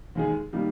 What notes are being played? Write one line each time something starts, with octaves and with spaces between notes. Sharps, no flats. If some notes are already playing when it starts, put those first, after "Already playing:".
D#2 D#3 G#3 D#4 G#4
D#3 G3 A#3 D#4